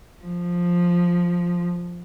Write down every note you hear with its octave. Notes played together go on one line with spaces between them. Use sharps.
F3